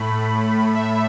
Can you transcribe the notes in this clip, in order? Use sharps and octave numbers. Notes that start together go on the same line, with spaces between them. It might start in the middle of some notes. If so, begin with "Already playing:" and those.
Already playing: A2 A3 B5
E5